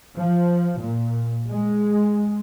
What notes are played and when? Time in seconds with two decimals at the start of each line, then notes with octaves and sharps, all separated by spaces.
0.17 F3
0.80 A#2
1.50 G#3